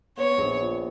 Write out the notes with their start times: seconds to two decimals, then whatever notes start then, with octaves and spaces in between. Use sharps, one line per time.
0.17 B3 C#5
0.38 A#1
0.61 A#2